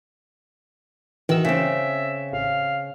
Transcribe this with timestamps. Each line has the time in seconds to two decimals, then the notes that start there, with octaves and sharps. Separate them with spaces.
1.29 D#3 E3 F#4 E6
1.45 C#3 C4 E5
2.33 A1 F5